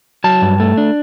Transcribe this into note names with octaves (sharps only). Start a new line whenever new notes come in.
F#3 A5
G2
A3
D4